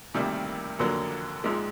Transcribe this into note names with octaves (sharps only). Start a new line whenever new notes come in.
D2 C3 D#3 G3 A#3
F1 D#2 D3 F#3 A#3
A#1 G#2 F3 G#3